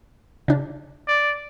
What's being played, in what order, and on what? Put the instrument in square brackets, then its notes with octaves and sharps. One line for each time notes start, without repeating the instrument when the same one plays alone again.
[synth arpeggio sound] C#3 D4
[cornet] D5